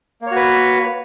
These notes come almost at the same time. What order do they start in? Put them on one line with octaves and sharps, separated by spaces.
A#3 C#5 F#4 B4